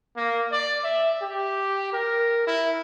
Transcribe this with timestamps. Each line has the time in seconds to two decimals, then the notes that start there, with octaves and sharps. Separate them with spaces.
0.16 A#3
0.52 D5
0.83 E5
1.22 G4
1.92 A#4
2.47 E4